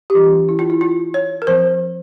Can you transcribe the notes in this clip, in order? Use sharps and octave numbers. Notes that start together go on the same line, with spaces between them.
G4
E3 G3 C#4 F4
E4
F4
E4
F4
C#5
A#4
F3 C4 C5